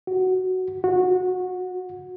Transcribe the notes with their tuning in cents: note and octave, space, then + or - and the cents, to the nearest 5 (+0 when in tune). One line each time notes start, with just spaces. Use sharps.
F#4 +5
F#4 -20